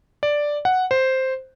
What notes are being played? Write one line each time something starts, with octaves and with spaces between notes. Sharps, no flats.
D5
F#5
C5